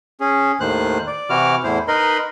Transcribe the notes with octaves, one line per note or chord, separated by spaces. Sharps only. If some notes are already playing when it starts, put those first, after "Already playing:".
C#4 G#4
D#2 A2 D#3 C5 F#6
D5
C3 E3 E4 F#4 D6 F6
E2 A2 E4 C5
D#4 A#4 B4 D#5 B5 C6